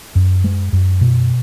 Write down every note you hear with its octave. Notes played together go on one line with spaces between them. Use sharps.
F#2
G#3
F#2
B2